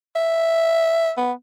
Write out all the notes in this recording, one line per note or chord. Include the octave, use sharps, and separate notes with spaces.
E5
B3